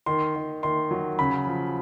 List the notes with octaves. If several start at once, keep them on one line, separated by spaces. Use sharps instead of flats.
D#3 C6
D#3
D#3 C6
F#3
C#3 B5
F3